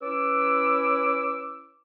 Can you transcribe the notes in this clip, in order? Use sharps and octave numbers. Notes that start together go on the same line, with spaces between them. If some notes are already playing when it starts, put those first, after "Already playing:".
C#4 E4 B4 D6 E6